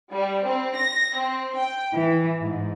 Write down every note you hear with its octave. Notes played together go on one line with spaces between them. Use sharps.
G3
C4
A#6
C4
G5
E3
G#2